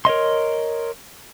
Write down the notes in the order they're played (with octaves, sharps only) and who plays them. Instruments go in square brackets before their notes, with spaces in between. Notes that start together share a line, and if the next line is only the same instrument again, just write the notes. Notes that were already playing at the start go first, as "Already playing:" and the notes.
[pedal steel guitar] A#4 C#5 D#5 C6